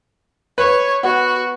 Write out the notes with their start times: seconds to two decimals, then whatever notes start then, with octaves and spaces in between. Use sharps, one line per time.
0.58 B4 C#5
1.03 B3 F#4